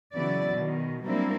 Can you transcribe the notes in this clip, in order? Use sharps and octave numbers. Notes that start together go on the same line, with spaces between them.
C#3 E3 F#3 B3 E4 D5
B2 D#3
F#3 G3 A#3 C4 D4 E4